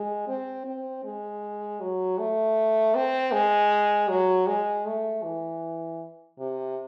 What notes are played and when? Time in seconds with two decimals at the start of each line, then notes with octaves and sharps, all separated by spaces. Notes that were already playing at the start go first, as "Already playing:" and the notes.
Already playing: G#3
0.28 C4
0.66 C4
1.04 G#3
1.80 F#3
2.18 A3
2.95 C4
3.32 G#3
4.09 F#3
4.47 G#3
4.86 A3
5.23 E3
6.39 C3